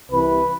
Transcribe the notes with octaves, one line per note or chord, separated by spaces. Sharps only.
C2 C3 E3 B4